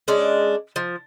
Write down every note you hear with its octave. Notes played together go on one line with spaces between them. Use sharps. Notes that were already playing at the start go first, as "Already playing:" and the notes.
G#3 C#4 D4 D5
F3